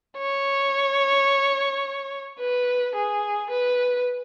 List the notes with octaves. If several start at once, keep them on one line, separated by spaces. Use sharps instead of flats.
C#5
B4
G#4
B4